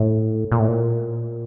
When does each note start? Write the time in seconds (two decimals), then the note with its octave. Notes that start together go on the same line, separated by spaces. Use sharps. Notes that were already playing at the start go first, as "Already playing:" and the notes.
Already playing: A2
0.52 A#2
0.60 A2
0.68 A#2